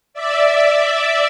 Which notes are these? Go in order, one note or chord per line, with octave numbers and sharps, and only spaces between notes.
D5 E5